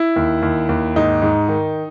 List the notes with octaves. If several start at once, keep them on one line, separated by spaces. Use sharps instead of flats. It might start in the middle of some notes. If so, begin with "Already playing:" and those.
Already playing: E4
D#2
D#2
D#2
G#2 D#4
G#2
D#3